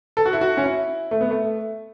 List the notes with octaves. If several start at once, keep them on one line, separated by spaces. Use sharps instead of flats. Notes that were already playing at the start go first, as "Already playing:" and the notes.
A4
F#4
E4
F#4
C#4
E4
A3
B3
A3